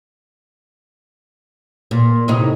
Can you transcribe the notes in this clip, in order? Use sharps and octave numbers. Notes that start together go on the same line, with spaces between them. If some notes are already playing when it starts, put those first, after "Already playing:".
A#2
A2 C3 D#4